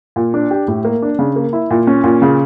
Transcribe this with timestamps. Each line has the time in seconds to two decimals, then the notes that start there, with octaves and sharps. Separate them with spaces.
0.16 A#2
0.34 D4
0.51 G4
0.68 A2
0.85 A#3
1.02 D4
1.19 C#3
1.36 A#3
1.53 E4
1.71 A#2
1.87 C#4
2.04 A#2
2.22 C#3